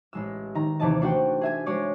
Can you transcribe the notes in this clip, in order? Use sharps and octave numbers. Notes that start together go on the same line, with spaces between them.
A1 G#3 E6
D#3 A#5
D#2 C3 E3 D5 D#5 A5
A3 D4 F#4 C5 F#5 G5
G#4 E5 G#5
G#3 F#4 G#4 C#5 D5